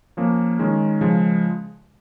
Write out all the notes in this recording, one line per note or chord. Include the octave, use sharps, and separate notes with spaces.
F3 A#3 C#4
D#3 G#3 C#4
C#3 F3 G#3